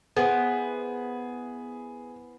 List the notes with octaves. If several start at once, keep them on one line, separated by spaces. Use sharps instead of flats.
B3 E4 G#4 C5